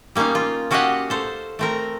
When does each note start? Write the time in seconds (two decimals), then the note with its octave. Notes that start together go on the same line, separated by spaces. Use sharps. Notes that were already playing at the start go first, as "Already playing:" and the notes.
0.15 G3 A#3 C#4 D#4 F5
0.35 F4
0.71 C#4 F#4 G4 D#5 F5 F#5
1.10 A4 C5 F5
1.59 A3 C4 A#4